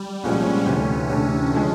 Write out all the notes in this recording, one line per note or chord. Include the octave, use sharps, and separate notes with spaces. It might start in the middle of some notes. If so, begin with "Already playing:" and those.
Already playing: G3
C2 A#2 F3 G#3 C4 C#4
D2 C3 E3 A3 C#4 D4
D2 C3 E3 A3 C#4 D4
D3 F3 G#3